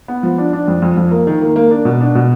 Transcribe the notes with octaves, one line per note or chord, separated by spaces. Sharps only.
B3
F3
D4
D4
F2
F2
F2
A#3
D#3
A#3
A#3
D4
B2
D4
B2